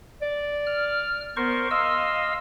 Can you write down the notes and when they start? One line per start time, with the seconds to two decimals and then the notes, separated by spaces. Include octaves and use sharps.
0.22 D5
0.66 F6
1.37 B3 A#4 C5 C#6
1.71 D#5 F5 C6 E6